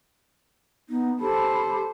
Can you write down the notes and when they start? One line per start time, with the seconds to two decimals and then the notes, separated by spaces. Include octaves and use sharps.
0.89 B3 D#4
1.21 G4 A4 C5 B5